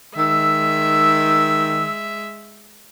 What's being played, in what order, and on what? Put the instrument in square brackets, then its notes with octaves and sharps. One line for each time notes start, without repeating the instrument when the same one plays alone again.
[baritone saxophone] D#3 [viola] G#3 E5 [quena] E6